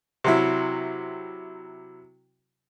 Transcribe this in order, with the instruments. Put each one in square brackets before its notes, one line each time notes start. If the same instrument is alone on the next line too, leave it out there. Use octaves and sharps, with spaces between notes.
[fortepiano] C3 F#3 E4